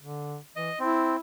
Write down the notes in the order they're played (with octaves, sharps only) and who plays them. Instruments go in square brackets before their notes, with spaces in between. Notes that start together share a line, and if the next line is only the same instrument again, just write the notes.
[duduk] D3
[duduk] E3 [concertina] D#5
[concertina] C4 [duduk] E4